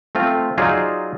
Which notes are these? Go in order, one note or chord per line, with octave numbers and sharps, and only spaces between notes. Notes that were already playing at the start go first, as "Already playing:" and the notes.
A3 C4 F4
F#3 D#4 F4 G#4 C5 D5